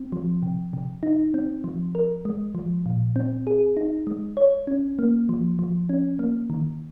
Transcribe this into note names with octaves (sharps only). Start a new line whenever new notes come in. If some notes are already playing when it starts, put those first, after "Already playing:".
Already playing: C4
F3
C3
C3
D#4
C4
F3
A#4
G#3
F3
A#2
C4
G#4
D#4
G#3
C#5
C#4
A#3
F3
F3
C#4
A#3
D#3